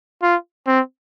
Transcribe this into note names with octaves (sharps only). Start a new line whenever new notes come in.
F4
C4